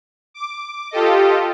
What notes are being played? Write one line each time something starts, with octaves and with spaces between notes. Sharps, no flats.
D6
F4 G4 A4 D#5